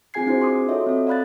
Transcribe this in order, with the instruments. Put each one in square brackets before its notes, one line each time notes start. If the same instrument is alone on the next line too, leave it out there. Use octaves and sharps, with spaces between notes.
[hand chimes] C4 F4 G#4 G#5 G#6 C7
C4 D4 E4 F#4 G#4 C5
C6 D6 D#6
F4 F#4 A4 C#5 D#5 E5
C4 A4
D5 F5 B5 F#6 A6